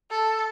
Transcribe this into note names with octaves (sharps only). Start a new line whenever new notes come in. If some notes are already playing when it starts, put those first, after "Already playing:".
A4